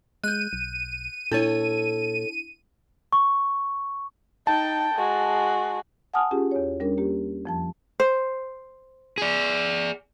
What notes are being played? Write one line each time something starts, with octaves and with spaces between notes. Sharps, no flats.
G#3 F#6 G6 D#7
B1
A#2 D4 E4 A4 C#5
C#6
D#4 G5 A5
G#3 F#4
F#5 G#5 A5 D#6 F6
C#4 F4 G4 G#4
E2 C#5
G3 C#4 D4 A#4
A#3 G4
F2 F3 A5
C5
G#4 D5